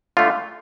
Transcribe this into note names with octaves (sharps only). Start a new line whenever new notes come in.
D3 A3 F4